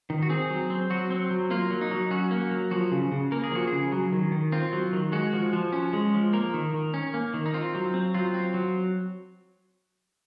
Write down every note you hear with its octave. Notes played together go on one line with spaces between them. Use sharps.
D#3
F#4
C4 G#4
F#3
C4
F#3 F#4
C4
F#3
A#3 F4
F#3
D#4
F#3
C#4 F#4
A#3
F#3
F3 F#4
C#3
C#3
A#3 A#4
G#4
F3 F#4
C#3 G#4
F#3
D#3
D#3
C4 F4
F#3
D#3
G#3 F#4
F3
F3
C#4
G#3
F3
A#3 A#4
D#3
D#3
C#4
A#3
D#3
D#4
C4 F4
F#3
C4
F#3 F4
C4
F#3